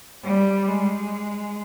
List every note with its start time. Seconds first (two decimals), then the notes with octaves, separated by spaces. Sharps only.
0.24 G3
0.68 G#3